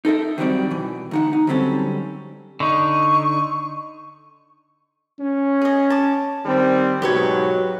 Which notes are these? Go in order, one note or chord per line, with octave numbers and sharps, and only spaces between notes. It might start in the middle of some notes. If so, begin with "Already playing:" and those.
D#4 A4 A#4 E5
D#3 E3 F#3 G3 C4 D5
B2 E3
D2 D#4 F#5
D#4
D3 F#3 G3 C4 C#4 A4
D3 D#4 C#6
C#4
G#4 D#5
A5 D6
D#3 G3 C4
G#2 B2 F#3 G4 B4 C#5